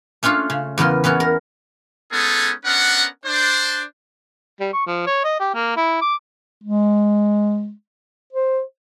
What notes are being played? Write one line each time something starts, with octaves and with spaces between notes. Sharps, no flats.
A3 C#4 D4 F4 A4
C#3
E2 C#3 B3 A#4 C6
E3 B3 C#4 F#4
A#4
G#3 B3 C#4 D#4 G#4 A4
B3 C#4 D4 A#4 F#5
D4 C5
G3
C#6
F3
C#5
D#5
G4
A#3
E4
D6
G#3
C5